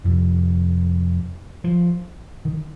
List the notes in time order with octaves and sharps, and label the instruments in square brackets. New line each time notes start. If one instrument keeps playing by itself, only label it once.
[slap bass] F2 C3 D#3
F3
D#3